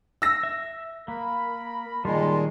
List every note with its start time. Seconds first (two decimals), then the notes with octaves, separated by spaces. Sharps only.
0.22 E6 A#6
0.43 E5
1.08 A#3 A#4 B5
2.05 A#2 D#3 G3 G#3 D#5 A5 C6